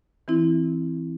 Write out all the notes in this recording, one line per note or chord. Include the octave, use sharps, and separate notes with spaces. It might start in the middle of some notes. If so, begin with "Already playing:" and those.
E3 C4 E4